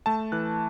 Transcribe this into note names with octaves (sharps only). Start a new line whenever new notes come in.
A3 A5
E3 F#6